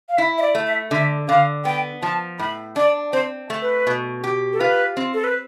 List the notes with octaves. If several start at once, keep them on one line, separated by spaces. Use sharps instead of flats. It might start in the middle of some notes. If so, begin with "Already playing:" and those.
F5
E4 E5
E5
D5
A3
E5
D3 E5
D3 F5
B3 G5
F3 A5
A2 B5
D4 D5
C4 C5
A3
B4
B2
G4
A4
F4 B4
C4
A4
B4